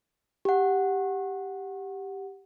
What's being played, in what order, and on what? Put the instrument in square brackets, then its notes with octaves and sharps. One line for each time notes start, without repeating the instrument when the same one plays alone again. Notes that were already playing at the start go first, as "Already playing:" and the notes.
[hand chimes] G4 F#5